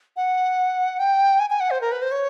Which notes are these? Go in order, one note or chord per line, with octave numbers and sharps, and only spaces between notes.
F#5
G5
G#5
G#5
F#5
C5
A#4
B4
C5
C#5